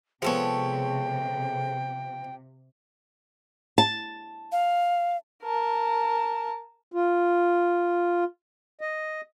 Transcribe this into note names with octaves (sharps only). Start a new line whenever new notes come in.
C3 F3 G#3 B3 A4 C#5 G5
A5
F5
A#4 A5
F4
D#5